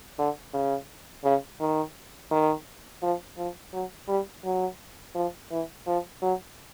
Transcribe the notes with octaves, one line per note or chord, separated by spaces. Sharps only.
D3
C#3
C#3
D#3
D#3
F3
F3
F#3
G3
F#3
F3
E3
F3
F#3